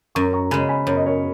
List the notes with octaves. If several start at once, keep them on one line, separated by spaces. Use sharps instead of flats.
F#2 A#5 C#6
A#5 C#6
C#3 G#3 G#5 B5
G#5 B5
F#2 C#5
D#5
A#4 C#5